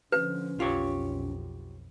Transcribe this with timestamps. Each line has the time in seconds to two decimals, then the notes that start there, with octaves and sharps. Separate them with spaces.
0.12 D3 F3 C#4 B4
0.60 B1 F2 F4 G4 C#5